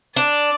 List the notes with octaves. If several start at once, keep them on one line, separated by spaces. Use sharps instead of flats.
D4 D5